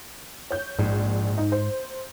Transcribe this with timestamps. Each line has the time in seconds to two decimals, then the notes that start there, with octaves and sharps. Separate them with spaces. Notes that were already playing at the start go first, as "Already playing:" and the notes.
0.51 C#5 G6
0.79 A#1 G#2
1.38 D#4
1.52 C5